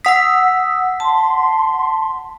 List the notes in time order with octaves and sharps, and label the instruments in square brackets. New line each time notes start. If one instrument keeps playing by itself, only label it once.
[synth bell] F#5 B6 [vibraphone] D#6 E6
[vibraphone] A5 [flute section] C6